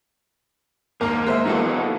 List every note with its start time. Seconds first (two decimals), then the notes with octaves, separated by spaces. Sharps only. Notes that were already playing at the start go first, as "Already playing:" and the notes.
1.01 D#2 G#2 A#3 A#4
1.27 G#3 C5 E5
1.45 E3 A#3 B3 D#4 F#4 A4